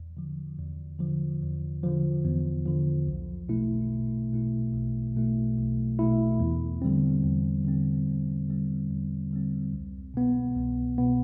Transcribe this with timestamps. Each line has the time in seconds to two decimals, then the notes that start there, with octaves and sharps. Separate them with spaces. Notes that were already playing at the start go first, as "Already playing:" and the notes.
Already playing: E2
0.17 D3 F3
0.59 E2
0.99 D3 F3
1.42 E2
1.83 D3 F3
2.25 E2
2.66 D3 F3
3.07 B1
3.49 B2 A3 E4
3.91 B1
4.33 B2 A3 E4
4.74 B1
5.16 B2 A3 E4
5.57 B1
5.99 B2 A3 E4
6.40 E2
6.82 D3 G3 C4
7.23 E2
7.65 D3 G3 C4
8.07 E2
8.48 D3 G3 C4
8.90 E2
9.31 D3 G3 C4
9.73 C2
10.14 B2 B3
10.56 C2
10.98 B2 B3